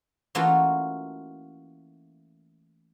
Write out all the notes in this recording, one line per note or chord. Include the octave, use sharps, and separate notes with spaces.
E3 A3 A#3 C#4 F4 F#4